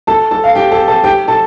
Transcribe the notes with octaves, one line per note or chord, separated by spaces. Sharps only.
A4 A5
A4 A5
F5
G4 G5
A4 A5
A4 A5
G4 G5
A4 A5